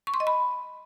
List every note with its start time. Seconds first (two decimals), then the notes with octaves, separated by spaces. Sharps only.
0.07 C#6
0.14 C6
0.20 D#5
0.27 B5